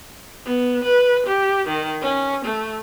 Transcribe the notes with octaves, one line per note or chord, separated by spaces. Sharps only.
B3
B4
G4
D#3
C#4
A3